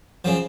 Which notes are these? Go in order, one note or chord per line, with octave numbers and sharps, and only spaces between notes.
C#3 F3